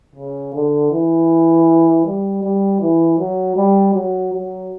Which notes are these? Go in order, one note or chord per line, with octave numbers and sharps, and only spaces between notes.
C#3
D3
E3
G3
G3
E3
F#3
G3
F#3
F#3